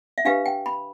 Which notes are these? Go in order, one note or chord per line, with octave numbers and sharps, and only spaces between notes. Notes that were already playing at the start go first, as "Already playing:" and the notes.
E5
D4 G4 B4 F5
G5
B5